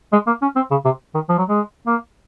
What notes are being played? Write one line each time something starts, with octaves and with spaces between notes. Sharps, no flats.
G#3
A#3
C#4
C4
C#3
C3
D#3
F3
F#3
G#3
A#3